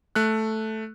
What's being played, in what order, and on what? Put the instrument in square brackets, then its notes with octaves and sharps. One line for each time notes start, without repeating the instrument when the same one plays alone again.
[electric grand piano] A3 F#6